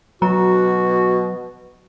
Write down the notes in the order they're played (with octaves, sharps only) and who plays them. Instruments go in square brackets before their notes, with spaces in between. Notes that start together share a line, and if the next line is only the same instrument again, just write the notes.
[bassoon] B2 [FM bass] F#3 [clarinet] F#4 [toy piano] A#5